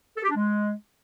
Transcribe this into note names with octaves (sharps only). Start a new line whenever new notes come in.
A4
G4
D4
G#3